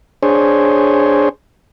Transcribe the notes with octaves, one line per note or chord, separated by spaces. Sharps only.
D4 G#4 C5 C#5